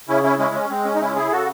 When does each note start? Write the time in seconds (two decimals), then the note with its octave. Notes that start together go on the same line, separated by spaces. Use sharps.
0.09 C#3 C#4 E4
0.23 C#4 E4
0.38 G#3 C#4 E4
0.55 C#4
0.70 G#3 C4
0.85 C#4
0.95 D#4
1.01 C#3 C#4 E4
1.16 E4 G#4
1.31 C#3 F#4 A4